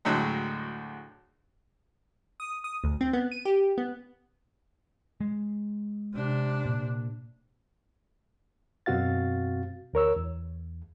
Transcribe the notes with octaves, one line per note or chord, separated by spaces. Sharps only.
D2 A2 D3 F#3 G#3
D#6
D#6
D2
C4
B3
D#7
G4
B3
G#3
C3 D4
A#2
F#2 B2 C4 F#4 F5 A6
D2 A#4 C#5 E6
E2